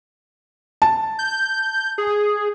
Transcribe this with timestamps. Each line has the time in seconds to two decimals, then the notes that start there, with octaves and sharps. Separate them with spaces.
0.82 A5
1.19 G6
1.98 G#4